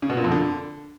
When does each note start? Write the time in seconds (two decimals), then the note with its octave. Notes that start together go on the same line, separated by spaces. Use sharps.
0.02 C#3
0.10 B2
0.17 A#2
0.24 F2
0.32 D3